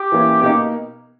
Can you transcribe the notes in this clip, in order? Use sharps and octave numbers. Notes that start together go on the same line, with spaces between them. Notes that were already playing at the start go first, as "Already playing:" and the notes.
Already playing: G4
E3 A#3 C#4 E4
B2 A#3 D#4 G4